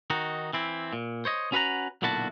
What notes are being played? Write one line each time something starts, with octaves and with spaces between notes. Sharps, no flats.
D#3 D#4 F#4
E3 C4 E4
A#2
C5 C#5 D#5
C#4 F#4 B4 F5 F#5 A#5
B1 A#2 D3 E4 F#4 A5